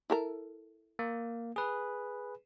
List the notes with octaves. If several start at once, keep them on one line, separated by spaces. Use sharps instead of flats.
E4 A4 A#4
A#3
G#4 B4